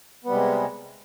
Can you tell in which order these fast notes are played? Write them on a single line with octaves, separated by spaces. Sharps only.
B3 G3 C3 G#3